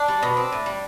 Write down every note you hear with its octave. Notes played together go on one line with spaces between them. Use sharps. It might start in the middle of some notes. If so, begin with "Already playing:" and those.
Already playing: D4
G3
B2
C4
A2
G3